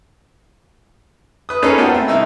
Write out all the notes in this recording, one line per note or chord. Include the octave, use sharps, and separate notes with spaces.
B4 D#6
A#3 C#4 D#4 G#4 A4 B4
B3 C4 F4 F#4 A5
A3
C2 C4 D#4 E4 D#5 E6